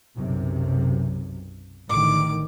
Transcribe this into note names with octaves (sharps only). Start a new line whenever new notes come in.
B1 F#2 C3
A1 D3 D#3 D6